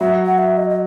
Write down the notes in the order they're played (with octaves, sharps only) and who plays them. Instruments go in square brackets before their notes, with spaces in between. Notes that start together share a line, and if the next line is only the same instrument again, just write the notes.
[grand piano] F#3 [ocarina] E5
[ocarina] F#5
E5
D#5
D#5